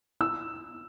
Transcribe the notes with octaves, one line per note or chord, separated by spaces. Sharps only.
E6